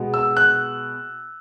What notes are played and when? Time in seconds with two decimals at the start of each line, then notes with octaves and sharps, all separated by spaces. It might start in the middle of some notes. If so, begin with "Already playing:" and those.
Already playing: B2 G#3 B3
0.14 E6
0.37 F#6